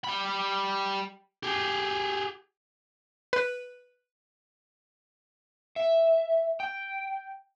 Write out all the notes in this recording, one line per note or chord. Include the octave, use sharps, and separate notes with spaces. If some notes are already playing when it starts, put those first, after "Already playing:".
G3 B5
G4 G#4
B4
E5
G5